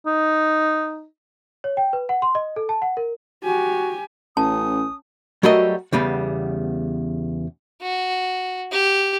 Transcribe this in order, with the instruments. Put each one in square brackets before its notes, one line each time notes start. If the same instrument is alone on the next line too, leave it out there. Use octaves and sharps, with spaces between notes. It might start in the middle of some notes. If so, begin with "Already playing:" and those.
[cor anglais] D#4
[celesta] C#5
G5
B4
F#5
C6
D#5
A4
A5
F#5
A#4
[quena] F#4 [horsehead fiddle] G4 G#5
[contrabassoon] A1 [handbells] C#4 [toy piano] A5 [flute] D#6
[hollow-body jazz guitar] F#3 G3 A3 F#4 A#4 D#5
E2 C#3 G3 B3
[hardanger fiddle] F#4
G4